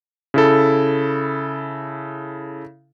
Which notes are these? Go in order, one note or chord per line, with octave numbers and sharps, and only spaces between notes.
C#3 E4 A4